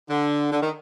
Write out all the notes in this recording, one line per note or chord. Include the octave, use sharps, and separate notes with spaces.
D3
D3
D#3